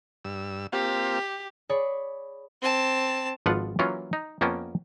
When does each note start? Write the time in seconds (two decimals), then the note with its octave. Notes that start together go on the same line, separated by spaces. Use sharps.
0.25 G2 E6
0.73 A#3 C4 F4 G4
1.69 G#4 C#5 D5 B5
2.62 C4 A5
3.46 G#1 F3 D4 F4 B4 F#5
3.79 E3 F#3 A#3 C#4 F4
4.13 D#4
4.41 F2 A#3 B3 C#4 G5 A5